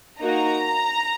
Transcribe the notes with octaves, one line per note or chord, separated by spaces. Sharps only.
A#3 D#4 F#4 A#5